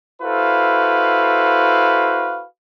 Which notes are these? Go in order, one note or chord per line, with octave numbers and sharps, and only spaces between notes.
E4 F#4 A4 B4 C5 F5